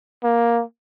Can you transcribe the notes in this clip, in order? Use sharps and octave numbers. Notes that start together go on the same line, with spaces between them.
A#3